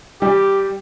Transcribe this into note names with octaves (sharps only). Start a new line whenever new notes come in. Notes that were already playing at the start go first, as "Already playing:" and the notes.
G3 G4